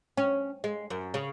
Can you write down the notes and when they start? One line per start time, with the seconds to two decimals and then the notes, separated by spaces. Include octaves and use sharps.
0.17 C#4
0.64 G#3
0.90 F#2
1.14 C#3